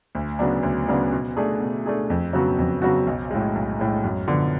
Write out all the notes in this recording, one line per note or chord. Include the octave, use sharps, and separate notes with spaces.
D2
C#3 F#3 B3 D4
D2
C#3 F#3 B3 D4
B2
A3 D4 G#4
B2
A3 D4 G#4
F2
C#3 F#3 B3 F#4
F2
C#3 F#3 B3 F#4
B1
A2 G#3
B1
A2 G#3
F#2
D3 F3 B3